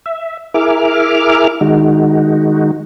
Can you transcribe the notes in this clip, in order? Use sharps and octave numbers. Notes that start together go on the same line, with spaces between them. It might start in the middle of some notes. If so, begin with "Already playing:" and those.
E5
E4 G#4 A#4 E5 D6 F6
D#3 G#3 D#4 F#4